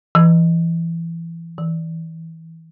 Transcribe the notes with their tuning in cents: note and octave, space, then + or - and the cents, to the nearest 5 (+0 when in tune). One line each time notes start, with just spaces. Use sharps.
E3 +20
E3 -20